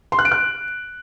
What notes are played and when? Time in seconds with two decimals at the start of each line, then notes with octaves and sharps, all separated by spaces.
0.12 C6
0.19 F#6
0.25 D7
0.32 F#6